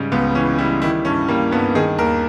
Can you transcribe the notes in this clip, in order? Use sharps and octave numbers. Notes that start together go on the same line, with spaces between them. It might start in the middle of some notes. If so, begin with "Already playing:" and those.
Already playing: G#2 C#3 G3
C#2 B3
E3 C#4
G3 E4
D#3 E4
G2 C#4
G3 A#3
G2 B3
D#3 G#4
D#2 A#4